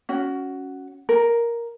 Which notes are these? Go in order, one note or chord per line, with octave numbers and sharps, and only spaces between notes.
C#4 F#4
A#4